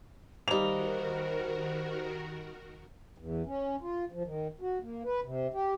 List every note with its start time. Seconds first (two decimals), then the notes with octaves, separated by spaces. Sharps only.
0.48 D#3 G3 A#3 D#4 F#4 A#4 C5 F7
3.18 E2
3.46 C#4
3.81 F4
4.12 F3
4.25 D#3
4.61 F#4
4.82 A#3
5.05 B4
5.24 C3
5.53 G4